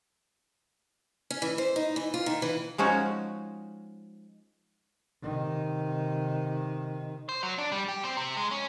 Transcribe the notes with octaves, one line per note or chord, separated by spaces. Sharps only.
C#4
E3
C5
D#4
E3
F4
D#3
E3
F3 G#3 C#4 D#4 F#4
C3 D#3
C5
F#3
D4
G3
G4
C4
C3
G#3
C#4